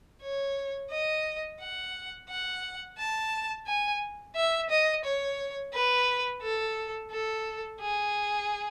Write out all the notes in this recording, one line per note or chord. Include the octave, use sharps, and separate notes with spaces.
C#5
D#5
F#5
F#5
A5
G#5
E5
D#5
C#5
B4
A4
A4
G#4